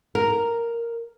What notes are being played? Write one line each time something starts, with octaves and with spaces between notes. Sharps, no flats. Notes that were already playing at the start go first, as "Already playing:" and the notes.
A#4